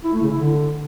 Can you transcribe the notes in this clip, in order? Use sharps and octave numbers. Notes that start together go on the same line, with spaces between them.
E4
A3
C#3
E4
D3